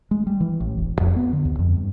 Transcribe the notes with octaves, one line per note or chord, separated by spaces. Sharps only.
G#3
G3
E3
A1
E1
F2
B3
D3
D#2
F2
G2